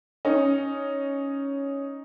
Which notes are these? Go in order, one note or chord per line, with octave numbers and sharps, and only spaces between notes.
C#4 D#4